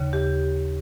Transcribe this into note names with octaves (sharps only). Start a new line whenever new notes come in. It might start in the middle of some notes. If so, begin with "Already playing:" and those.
Already playing: D#2 C#3
G4